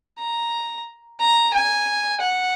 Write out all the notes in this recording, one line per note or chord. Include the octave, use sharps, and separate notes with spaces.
A#5
A#5
G#5
F#5